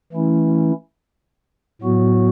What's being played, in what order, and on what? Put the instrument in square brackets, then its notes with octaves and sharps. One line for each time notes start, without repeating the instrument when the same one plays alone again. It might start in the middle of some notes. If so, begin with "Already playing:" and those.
[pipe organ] E3 A3 C#4 E4
A2 F#3 B3 F#4